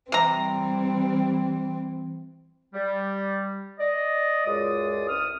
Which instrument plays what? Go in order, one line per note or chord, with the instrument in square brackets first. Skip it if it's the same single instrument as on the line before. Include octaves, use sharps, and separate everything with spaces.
[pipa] C3 A#5 [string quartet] E3 C4 [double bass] G3
[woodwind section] G3
D5 D#5
C#2 F#2 G#3 F4 D5 D#6
C2 D#6 F6